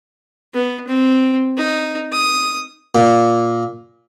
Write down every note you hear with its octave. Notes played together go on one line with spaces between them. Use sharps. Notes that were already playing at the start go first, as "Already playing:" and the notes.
B3
C4
D#4
D#6
A#2